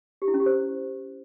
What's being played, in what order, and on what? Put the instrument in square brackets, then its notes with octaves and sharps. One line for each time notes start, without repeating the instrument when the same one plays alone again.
[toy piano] G4
E4
C#4
G4
C5